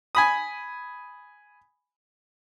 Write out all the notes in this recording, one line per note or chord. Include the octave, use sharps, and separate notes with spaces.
G#5 B5 D#6